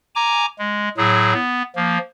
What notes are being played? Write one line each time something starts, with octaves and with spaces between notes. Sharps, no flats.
G#5 A#5 D6
G#3
A2 F#3 G#4
B3
F3 A#3